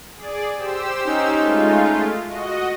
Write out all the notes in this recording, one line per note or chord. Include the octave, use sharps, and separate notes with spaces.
G#4 D5
G4 C5 E6
C#4 D#4
G#3 A3 F4
F#4 D#5